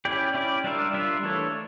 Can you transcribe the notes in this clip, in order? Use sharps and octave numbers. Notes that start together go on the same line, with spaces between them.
C#4 E4 G4 D5
C#4 E4 G4 D5
G3 D4 F4 A#4 E5
G3 D4 F4 A#4 E5
E3 A3 D4 A4 C#5